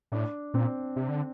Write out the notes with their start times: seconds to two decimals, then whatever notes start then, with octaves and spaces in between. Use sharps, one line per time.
0.12 A2 D4
0.54 A#2 C4
0.96 C3
1.09 D3